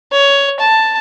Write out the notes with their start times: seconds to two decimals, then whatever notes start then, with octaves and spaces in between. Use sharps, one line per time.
0.12 C#5
0.60 A5